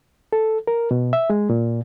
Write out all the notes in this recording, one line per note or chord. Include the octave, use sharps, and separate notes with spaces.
A4
A#4
B2
E5
G#3
A#2